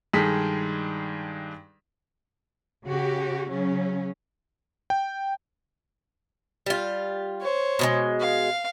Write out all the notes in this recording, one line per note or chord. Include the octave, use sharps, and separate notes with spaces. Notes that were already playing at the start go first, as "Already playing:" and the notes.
G2 D#3 G#3 G#4 A4 B6
C#3 F#4 G4
C#3 F#3 C#4
G5
G3 F4
C5 C#5
B2 D3 G#3
F5